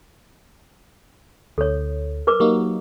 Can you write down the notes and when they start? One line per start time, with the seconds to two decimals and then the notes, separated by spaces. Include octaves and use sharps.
1.58 D2 A4 C#5
2.27 A#4 B4 D6
2.40 F#3 A#3 D#4 G4